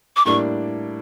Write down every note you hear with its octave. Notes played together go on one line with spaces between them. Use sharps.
D6
A2 G3 A#3 D4 C#6